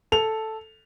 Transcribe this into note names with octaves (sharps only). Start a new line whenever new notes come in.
A4 F7